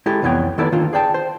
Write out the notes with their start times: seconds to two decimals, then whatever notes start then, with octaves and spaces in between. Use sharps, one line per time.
0.06 G#3 E4 G4 A4
0.22 C2 F2 E3 B3 C#5 G5
0.58 D#3 A#3 B3 E4 A4 D5
0.72 D3 D#3 A#3 F4
0.93 G#4 D5 G5 A5
1.14 C5